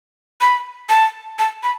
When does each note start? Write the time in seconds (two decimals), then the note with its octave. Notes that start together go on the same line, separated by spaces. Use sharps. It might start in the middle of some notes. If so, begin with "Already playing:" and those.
0.41 B5
0.89 A5
1.39 A5
1.63 B5